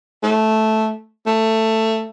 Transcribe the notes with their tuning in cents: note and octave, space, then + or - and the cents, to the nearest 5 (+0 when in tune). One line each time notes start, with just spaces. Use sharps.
A3 -10
A3 +15